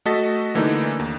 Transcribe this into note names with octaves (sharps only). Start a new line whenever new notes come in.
A3 F#4 A4 D#5 A6 B6
D3 E3 A3 A#3 D4 D#4
D#2